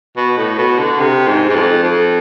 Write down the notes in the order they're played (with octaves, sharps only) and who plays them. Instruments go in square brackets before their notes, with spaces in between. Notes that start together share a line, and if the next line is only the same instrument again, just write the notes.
[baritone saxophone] B2
A2
B2
D3
C3
G#2
G#2
F2
F2